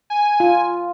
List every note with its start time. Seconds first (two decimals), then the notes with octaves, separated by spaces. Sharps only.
0.10 G#5
0.40 F4